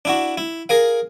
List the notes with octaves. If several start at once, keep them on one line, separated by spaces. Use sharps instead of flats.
D4 E4 F#4
E4
G#4 A#4 F5